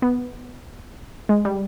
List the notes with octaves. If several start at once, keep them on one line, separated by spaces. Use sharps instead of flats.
B3
G#3
G3